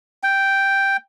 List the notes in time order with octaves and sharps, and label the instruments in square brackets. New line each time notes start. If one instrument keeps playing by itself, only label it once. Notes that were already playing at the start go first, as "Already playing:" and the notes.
[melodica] G5